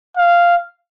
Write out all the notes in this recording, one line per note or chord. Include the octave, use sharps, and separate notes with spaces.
F5